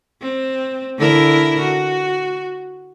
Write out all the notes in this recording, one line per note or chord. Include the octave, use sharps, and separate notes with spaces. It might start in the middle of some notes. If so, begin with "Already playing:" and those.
C4
D3 E4 A#4
F#4